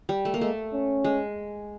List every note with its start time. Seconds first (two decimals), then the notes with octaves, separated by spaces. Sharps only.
0.09 G3
0.25 A3
0.34 A#3
0.41 G#3 A3
0.73 C#4
1.04 G#3